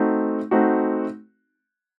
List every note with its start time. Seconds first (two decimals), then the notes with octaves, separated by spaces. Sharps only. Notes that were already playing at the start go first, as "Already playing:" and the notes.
Already playing: A3 C4 D#4 F#4
0.51 A3 C4 D#4 F#4